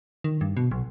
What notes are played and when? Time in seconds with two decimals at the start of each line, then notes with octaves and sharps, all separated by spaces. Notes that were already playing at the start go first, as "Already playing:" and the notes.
0.24 D#3
0.41 G2
0.57 B2
0.71 B1